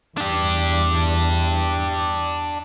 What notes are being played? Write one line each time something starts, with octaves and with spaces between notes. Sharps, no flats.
E2 D4 G4